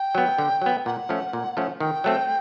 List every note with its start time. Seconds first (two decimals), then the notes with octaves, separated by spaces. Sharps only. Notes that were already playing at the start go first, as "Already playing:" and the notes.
Already playing: G5
0.15 F#3 B3
0.38 D3
0.62 F#3 B3
0.86 A#2 F#5
1.09 F3 A3 C#4
1.33 A#2
1.57 F3 A3 C#4
1.80 D#3 G5
2.04 F#3 A3 C4